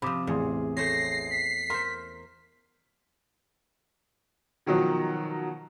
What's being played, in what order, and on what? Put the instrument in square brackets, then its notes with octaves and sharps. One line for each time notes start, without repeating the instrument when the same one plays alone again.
[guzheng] C3 F3 [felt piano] B5 D6 D#6
[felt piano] A1 G#4 C6 [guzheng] E2
[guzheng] A3 C5 C#5 [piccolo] A#6 [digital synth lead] C7
[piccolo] B6
[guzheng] A#4 C5 [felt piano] C6
[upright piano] B2 D#3 F3 F#3